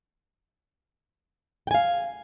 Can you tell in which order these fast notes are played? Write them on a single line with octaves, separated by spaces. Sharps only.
G5 G#5 F5